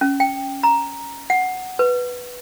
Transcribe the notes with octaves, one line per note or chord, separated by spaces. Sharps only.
C#4
G5
A#5
F#5
B4